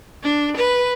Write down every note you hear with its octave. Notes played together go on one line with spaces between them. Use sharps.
D4
B4